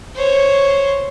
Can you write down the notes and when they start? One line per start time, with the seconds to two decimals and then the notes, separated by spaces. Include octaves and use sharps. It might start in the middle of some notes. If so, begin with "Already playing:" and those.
0.15 C5 C#5